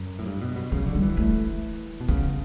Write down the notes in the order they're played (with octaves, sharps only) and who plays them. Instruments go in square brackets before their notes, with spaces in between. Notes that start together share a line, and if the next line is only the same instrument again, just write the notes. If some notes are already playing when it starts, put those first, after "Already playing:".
Already playing: [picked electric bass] F#2
A2
G2
B2
B2
[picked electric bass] C#3 [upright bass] F#3
[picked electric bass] D3
[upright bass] G3
[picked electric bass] E3
[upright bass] A3
[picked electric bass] B2
[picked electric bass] C#3 [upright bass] B3